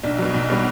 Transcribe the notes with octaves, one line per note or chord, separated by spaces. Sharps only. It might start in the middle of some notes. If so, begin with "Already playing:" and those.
B1 D4
B2 F#3
B1
B2 G3